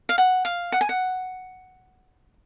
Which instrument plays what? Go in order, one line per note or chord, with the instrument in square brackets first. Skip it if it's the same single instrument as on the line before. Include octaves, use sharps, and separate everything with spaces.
[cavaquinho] F5
F#5
F5
F#5
G#5
F#5